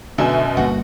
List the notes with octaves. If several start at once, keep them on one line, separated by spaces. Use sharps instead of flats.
F#2 B2 D3 E5 G#5
G1 G2 A#3 F#4